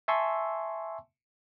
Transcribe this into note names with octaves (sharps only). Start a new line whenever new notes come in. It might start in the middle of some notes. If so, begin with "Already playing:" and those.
E5 G#5 A5 C6 C#6 E6